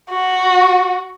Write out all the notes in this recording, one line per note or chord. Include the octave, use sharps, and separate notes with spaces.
F#4